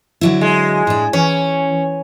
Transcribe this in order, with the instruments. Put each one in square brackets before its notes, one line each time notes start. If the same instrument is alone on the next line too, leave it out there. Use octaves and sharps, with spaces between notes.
[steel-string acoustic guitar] D3 F#3 E4
[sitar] G#3
[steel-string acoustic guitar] A2 D4
[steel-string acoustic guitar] E3 [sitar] C#4